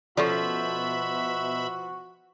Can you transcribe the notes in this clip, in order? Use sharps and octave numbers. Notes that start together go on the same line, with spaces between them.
B2 F3 C#4 F#4 A4 D5 E5 B5